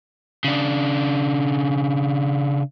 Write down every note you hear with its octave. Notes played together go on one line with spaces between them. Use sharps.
C#3 D4